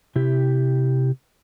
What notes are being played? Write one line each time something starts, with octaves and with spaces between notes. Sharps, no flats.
C3 E4 G4